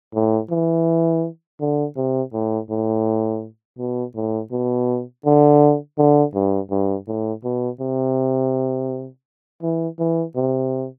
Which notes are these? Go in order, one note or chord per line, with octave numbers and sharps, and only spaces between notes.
A2
E3
D3
C3
A2
A2
B2
A2
B2
D3
D3
G2
G2
A2
B2
C3
E3
E3
C3